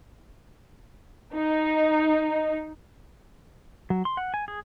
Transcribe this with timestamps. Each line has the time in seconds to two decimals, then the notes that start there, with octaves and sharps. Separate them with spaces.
1.35 D#4
3.90 F#3
4.05 C6
4.17 F#5
4.34 G#5
4.48 G#4